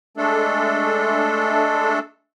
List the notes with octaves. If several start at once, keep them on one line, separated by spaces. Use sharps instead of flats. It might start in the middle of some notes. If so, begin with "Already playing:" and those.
G#3 A3 D4 A4